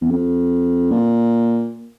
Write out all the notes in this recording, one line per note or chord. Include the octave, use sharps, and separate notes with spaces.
E2
F2
A#2